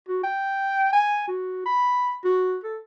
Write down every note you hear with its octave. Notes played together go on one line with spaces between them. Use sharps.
F#4
G5
G#5
F#4
B5
F#4
A4